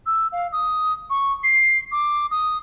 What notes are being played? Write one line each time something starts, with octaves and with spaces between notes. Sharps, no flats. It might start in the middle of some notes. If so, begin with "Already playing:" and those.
E6
F5
D#6
C#6
C7
D6
D#6